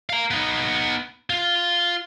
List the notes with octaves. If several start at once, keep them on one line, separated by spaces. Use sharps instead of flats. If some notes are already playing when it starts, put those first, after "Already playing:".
F5 A#5
B3 D#4
F4